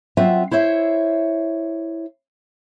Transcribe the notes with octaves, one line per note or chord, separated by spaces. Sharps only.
F#3 C4 F4 E5 F#5
E4 C5 C#5 E5